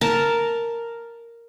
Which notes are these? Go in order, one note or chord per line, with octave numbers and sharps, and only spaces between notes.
A#4 A5